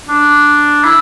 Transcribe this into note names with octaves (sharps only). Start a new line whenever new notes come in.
D4
E4